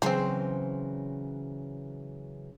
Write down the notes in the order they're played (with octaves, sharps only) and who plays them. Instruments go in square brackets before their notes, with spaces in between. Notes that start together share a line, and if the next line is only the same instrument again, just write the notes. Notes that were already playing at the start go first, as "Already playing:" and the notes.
[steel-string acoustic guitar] C#3 E3 F#3 [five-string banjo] C4 C5